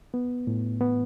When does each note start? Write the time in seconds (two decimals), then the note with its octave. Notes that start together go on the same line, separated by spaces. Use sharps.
0.14 B3
0.47 A2
0.81 B3